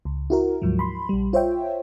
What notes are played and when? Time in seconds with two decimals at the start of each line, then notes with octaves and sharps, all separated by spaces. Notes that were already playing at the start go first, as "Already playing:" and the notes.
0.05 C#2
0.30 E4 F#4 A#4
0.62 D2 G#2 F3 F#3
0.79 B5 C6
1.09 A#1 G3
1.33 F4 C5 C#5 E5 G5